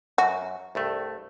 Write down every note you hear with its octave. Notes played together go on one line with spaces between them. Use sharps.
F#2 F#4
C2 G2 A3